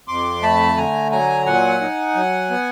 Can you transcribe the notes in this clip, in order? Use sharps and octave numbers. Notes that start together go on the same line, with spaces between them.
F2 C6 D6
A3 A5 B5
D3 G#5 A#5
F#3 G#5 A#5
A#2 F#5 G#5
D#4
F#3
B3